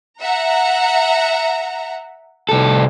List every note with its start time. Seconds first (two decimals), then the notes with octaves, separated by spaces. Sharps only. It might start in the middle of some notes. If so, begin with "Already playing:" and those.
0.20 E5 F#5 A#5
2.49 C2 A4